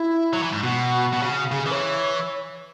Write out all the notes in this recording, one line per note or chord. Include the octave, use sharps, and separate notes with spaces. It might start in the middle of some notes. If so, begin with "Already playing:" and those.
Already playing: E4
F#3
E3
G#2
B2 F#4
B2
C#3
C#3 G#4
G#4
E3 C#5